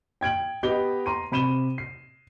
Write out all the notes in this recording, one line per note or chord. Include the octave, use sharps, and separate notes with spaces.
G5 G#6 D7 F#7
B3 G4 D#5 G7
A#5 C6 D#7
C3 B5 D#7 E7 G7
C7